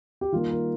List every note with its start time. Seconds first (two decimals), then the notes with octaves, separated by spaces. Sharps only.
0.21 G4
0.32 D#3 G3 A#3 F4
0.50 A#4